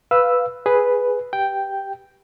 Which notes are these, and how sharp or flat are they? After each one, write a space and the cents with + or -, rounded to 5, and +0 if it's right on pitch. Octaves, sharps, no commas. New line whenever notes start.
B4 +0 F5 +0 E6 +0
G#4 +0 B4 +0
G4 +0 G5 +0